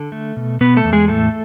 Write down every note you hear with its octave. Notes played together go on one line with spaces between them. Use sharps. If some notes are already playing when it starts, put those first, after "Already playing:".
Already playing: D3 A4
A3
B2
B2 B3 B4
A3 A4
E2
G#3 G#4
A2 A3 A4